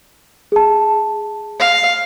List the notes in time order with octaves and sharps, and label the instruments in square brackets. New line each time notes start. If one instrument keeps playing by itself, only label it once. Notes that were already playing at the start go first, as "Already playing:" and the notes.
[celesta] G#4 A5
[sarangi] F5